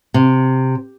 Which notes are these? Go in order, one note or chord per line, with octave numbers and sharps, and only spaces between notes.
C3